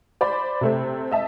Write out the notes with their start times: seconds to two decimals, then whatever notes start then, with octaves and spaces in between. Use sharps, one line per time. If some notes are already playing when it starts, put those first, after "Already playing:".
0.21 C5 D5 B5
0.61 C3 A3 C4
1.11 D#5 E5 A5